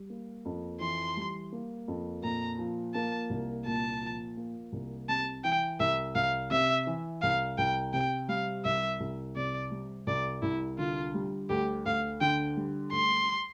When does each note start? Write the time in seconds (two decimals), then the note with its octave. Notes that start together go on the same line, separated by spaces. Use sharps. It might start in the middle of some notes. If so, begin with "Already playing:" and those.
Already playing: G3
0.10 A#3
0.45 F2
0.80 E3 C6
1.17 G3
1.52 A#3
1.88 F2
2.23 A#2 A#5
2.58 F3
2.94 A#3 A5
3.30 C2
3.66 A#2 A5
4.02 F3
4.37 A#3
4.72 C2
5.09 C3 A5
5.44 E3 G5
5.79 C2 E5
6.15 C2 F5
6.51 C3 E5
6.87 E3
7.22 C2 F5
7.58 C2 G5
7.93 C3 G5
8.29 G3 F5
8.65 C2 E5
9.00 C2
9.36 C3 D5
9.71 G3
10.07 C2 D5
10.42 C2 E4
10.78 D3 F4
11.14 G3
11.50 D2 G4
11.86 D2 F5
12.21 D3 G5
12.57 G3
12.92 D2 C6